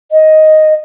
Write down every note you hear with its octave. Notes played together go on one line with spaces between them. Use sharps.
D#5